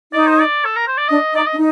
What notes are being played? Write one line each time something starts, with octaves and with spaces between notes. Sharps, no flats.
D#4 D5
C5
D5
A4
A#4
C5
D5
D4 D#5
D#4
D5
D#5
D4
D#4